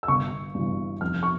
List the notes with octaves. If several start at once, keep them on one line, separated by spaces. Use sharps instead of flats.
E6
G1 C#6
G2 E3
F1 F6
C#6